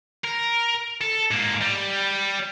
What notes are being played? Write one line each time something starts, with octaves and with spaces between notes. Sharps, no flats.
A#4
A4
G#2 A#3
G3